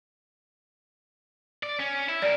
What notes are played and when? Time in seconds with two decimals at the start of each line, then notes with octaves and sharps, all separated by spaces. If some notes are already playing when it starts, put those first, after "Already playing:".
1.63 D5
1.79 C#4
2.09 E4
2.22 G3 A#4 D5